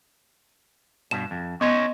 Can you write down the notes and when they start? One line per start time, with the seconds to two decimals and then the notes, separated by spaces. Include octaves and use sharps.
1.11 G2 B2 E7
1.31 F2
1.61 B3 C#4 D#4 C#5 D#5 C6